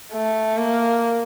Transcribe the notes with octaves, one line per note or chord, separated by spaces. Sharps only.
A3
A#3